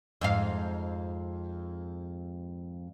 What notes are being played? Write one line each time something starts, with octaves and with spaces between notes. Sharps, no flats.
F2 G#2 F5